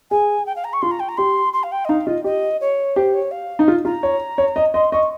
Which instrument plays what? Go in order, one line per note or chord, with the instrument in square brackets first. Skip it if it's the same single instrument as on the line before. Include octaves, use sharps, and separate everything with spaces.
[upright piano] G#4 [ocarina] G#5
[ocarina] G5
F5
A#5
C#6
[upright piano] F4 [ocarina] C6
[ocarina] A#5
G5
A#5
[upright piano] G4 [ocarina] C6
[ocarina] C6
F5
G5
D#5
[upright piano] D#4 [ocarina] F5
[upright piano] F4 [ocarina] D#5
[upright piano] G4 [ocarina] D#5
[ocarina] C#5
[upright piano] G4 [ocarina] C5
[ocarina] C#5
F5
[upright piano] D#4
F4
[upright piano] F4 [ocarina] A#5
[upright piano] C#5
C#5
D#5
[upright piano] D#5 [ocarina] C6
[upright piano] D#5 [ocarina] C#6